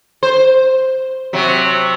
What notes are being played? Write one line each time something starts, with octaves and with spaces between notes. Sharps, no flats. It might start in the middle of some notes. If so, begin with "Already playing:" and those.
C5
C3 F#3